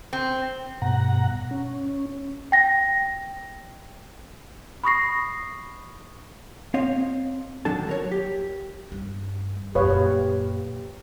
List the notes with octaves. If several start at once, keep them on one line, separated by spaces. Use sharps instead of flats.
C4
G2 B2 F#5 A#5
C#4
G5 A#6
B5 C#6 D#6 A#6 C7
C4 C#5 D#5 F5
D#3 F#3 D4 A4 A5
F#3 A#4 C#5
G4
G2
F#2 A#2 G4 B4 C#5 F5